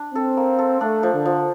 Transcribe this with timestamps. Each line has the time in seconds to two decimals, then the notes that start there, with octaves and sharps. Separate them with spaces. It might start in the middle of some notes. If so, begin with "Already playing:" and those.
Already playing: D4
0.15 C4 A4
0.37 A#3
0.59 A4
0.81 A3 D4
1.03 F3
1.14 D3
1.25 F3